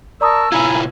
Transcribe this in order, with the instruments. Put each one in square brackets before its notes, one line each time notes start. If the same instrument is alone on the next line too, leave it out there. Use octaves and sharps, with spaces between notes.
[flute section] A#4 A5 C#6 [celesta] D5 A#5 D#6 [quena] E6
[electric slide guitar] B2 E4 F4 [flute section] G#5 A#5 B5 [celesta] G#6